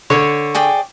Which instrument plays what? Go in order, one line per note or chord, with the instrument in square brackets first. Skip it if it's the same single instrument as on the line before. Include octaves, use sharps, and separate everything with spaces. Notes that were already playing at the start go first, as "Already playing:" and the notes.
[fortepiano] D3 [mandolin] C#5
[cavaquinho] G#4 D5 G5